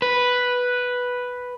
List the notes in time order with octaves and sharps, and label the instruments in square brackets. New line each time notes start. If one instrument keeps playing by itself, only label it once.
[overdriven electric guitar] B4